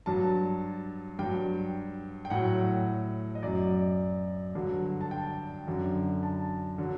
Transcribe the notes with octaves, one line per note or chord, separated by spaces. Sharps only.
G2 F#3 A5
G2 F#3 G5
G5
A2 F#3 F#5
D#5
F#2 F#3 D5
G2 D3 F#3
A5
G5
F#2 D3 F#3
A5
D3 F#3